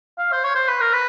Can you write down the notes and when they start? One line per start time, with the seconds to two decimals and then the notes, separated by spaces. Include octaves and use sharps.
0.19 F5
0.32 C5
0.44 C#5
0.55 C5
0.68 B4
0.81 A#4
0.93 B4